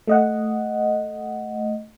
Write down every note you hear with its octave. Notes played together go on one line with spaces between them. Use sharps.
A3 D#5 F#5